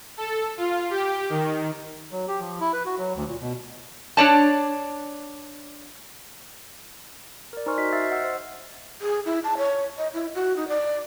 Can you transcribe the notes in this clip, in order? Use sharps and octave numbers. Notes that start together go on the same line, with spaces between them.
A4
F4
G4
D#3
F#3
G4
F3
E4
B4
F#4
F#3
D2
A#2
B2
D4 C#5 D5 A5
A#4 D5
D#4 C5 G#5 C6 C#6 F6
F#4 D#5 B6
C5 E5 E6 F6 A6 C7
D#5 F#5 E6
C5
G#4
E4
A5
C#5
D#5
E4
F#4
D#4
D5